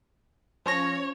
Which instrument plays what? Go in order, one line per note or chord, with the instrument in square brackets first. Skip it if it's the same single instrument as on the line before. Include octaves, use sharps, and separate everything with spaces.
[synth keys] F3 C#4 A#6 [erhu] C#5